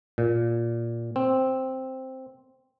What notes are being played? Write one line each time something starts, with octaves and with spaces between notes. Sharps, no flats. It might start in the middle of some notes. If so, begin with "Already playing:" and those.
A#2
C4